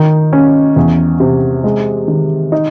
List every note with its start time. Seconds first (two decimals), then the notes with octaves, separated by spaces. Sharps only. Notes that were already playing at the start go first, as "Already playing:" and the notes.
Already playing: D#3
0.33 C#4
0.76 E2
1.20 C3
1.64 G#3
2.08 D#3
2.52 D#4